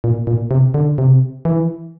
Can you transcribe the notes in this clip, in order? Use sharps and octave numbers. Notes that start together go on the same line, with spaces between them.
A#2
A#2
C3
D3
C3
E3